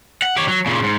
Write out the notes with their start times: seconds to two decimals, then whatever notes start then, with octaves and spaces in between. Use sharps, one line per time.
0.22 F#5
0.37 G4 C#5
0.48 F#3
0.66 A#2 C#3
0.83 G#2